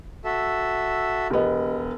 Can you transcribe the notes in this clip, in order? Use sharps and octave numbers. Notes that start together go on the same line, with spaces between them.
F#4 A4 E5
E1 B3 G4 D#5